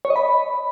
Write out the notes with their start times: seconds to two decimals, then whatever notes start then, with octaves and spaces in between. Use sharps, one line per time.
0.05 C#5
0.10 D#5
0.16 B5